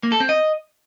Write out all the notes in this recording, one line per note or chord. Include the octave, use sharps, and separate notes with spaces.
A#3
A4
C4
D#5